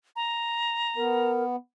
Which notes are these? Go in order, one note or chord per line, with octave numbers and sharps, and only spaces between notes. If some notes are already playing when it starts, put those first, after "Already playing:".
A#5
B3 A#4